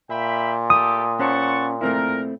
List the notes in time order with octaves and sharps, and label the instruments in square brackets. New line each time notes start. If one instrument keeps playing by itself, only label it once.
[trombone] A#2 [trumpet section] E5 G5 B5
[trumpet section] A3 G4 A4 [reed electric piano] D#6
[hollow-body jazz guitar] C#4 C5 [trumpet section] F#5 A5 C#6
[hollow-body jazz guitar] A3 C4 E4 [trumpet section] A#4